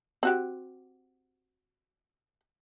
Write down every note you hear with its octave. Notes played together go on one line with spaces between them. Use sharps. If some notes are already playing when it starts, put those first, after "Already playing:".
C4 F#4 G4